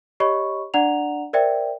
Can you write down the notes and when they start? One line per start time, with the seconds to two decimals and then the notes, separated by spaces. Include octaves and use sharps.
0.20 G4 C#5 D#5 B5 C#6
0.74 D4 D5 F#5 A#5 F7
1.33 A#4 C5 D5 E5 G5